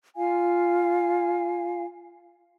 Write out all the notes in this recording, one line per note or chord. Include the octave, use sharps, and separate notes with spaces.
F4 F5 G#5